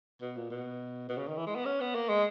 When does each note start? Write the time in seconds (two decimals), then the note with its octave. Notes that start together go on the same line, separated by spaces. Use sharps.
0.21 B2
0.36 A#2
0.51 B2
1.09 B2
1.18 C#3
1.27 D#3
1.37 E3
1.46 G#3
1.56 B3
1.65 C#4
1.80 B3
1.95 A#3
2.09 G#3